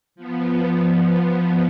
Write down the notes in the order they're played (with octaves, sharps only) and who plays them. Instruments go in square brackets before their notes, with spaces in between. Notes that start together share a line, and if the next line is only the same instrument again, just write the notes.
[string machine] F3 B3